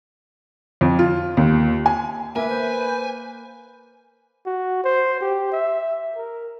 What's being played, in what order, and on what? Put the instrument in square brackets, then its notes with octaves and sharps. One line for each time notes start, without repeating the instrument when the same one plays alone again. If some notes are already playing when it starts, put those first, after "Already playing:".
[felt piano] F2
F4
D#2
G#5
[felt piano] A#3 [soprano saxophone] B4 [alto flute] E5 [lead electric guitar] G#5
[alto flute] C5
[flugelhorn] F#4
C5
G4
E5
A#4